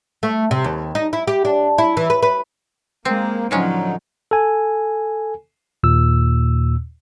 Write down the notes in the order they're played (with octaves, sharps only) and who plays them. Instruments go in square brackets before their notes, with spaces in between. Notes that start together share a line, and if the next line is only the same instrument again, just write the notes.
[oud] A3
C3
D#2
D#4
E4
G4
D4
E4
E3
B4
B4
[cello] G#3 [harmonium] A#3 [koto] C4
[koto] A2 G#3 C#4 [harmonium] D3 D#4 [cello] F3 F#3
[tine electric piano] A4 G#5
D#2 A#2 E6